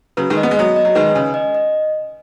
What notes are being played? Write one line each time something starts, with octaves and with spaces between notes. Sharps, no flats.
C#3 F#3 B4
D#3 G#3
D#5
B3
G#3
F#3 B3 D#5
D#5
F#3
D#3 G#3 B4
C#3 G#5
D#5
D#5